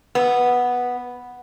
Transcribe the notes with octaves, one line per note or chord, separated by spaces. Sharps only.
B3